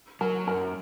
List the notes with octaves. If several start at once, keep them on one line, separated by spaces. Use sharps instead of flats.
F#3 A#4
F#2 A#4